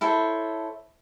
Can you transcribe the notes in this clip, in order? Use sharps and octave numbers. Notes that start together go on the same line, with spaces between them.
E4 A4 C5 C#5